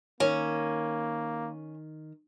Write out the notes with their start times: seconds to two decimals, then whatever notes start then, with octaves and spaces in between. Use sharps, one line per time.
0.20 D#3 A#3 C#4